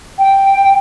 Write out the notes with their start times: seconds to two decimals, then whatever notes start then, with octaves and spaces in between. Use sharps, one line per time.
0.18 G5